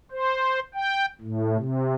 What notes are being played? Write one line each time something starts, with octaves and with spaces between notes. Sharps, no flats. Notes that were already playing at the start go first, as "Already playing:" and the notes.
C5
G5
A2
C3